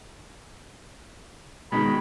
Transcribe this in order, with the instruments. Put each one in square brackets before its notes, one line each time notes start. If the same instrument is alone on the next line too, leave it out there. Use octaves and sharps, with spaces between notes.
[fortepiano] B2 D#3 G#3 [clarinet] B5